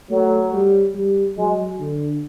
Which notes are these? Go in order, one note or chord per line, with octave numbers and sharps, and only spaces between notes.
F#3 A3
G3
G3
F#3 G#3
D3